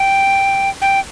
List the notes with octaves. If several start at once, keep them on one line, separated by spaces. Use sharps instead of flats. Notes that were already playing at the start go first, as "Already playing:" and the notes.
Already playing: G5
G5